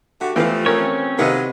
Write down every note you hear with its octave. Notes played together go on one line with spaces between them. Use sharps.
D3 A3 F#4 G4
E3 F3 A3 B3 F4 F5 G5
C4 C#4 A#4 C#5
C3 D#3 F#3 G#4 B4 D#5 F5 F#5